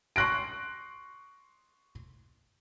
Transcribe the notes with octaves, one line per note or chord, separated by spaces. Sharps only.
C6 C#6 F#6 A#6 D7